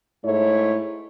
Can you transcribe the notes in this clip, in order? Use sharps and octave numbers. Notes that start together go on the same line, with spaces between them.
G#2 A3 E4 C#5